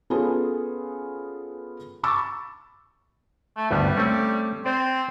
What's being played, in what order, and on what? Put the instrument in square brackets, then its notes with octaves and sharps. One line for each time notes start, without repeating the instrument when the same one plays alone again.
[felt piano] B3 C#4 F4 G#4 A4 B4
B5 C#6 D6 E6 A6
[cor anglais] A3
[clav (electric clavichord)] D2 G2 B3 [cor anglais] G3
[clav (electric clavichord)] A3 C4 C#4
[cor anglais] C4 [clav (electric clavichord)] C5 D5